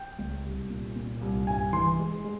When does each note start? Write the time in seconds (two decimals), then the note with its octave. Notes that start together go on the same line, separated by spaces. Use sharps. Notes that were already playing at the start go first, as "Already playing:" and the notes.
Already playing: G5
0.19 C#2
0.45 C2
0.70 A#2
0.96 A#2
1.21 C2
1.47 G2 G#5
1.73 E3 C6
1.99 G#3
2.24 G#3